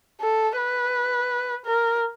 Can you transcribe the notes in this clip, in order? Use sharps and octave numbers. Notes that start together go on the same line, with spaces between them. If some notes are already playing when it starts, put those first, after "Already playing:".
A4
B4
A#4